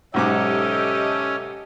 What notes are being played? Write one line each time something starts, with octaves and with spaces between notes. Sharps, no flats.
B1 G#2 C#4 G4 A4 D#5 E5 D6